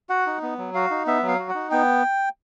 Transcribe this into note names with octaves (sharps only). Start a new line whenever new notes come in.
F#4 F#5
D#4
B3
F#3
F#4 F5
D#4
B3 E5
F#3
F5
F#4
F#5
D#4
B3 G5